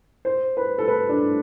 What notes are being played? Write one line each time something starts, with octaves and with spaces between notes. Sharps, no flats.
C5
B4
A4
B4
D4